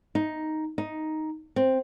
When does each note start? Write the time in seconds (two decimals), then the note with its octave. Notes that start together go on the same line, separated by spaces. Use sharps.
0.15 D#4
0.78 D#4
1.56 C4